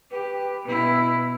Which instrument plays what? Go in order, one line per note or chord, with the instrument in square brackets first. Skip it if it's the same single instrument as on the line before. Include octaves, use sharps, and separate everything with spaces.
[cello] G4 [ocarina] B4
[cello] B2 E4